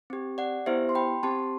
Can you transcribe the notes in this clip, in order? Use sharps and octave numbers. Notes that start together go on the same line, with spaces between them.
C4 G4
D5 F#5
B3 E4 G4 C5 E5
C6
G5 B5
C4 G4 A5 C6